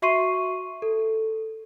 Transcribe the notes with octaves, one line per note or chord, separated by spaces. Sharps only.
F#4 E5 C6 C#6 C7 D#7
A4